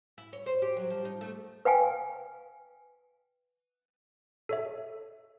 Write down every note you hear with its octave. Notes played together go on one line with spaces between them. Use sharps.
E4
C#5
C5
G4
F#3
F3
D#4
A3
B4 F5 G5 G#5
A4 C#5 E5